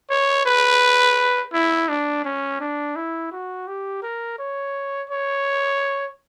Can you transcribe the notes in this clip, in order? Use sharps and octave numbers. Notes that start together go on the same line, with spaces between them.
C#5
B4
E4
D4
C#4
D4
E4
F#4
G4
A#4
C#5
C#5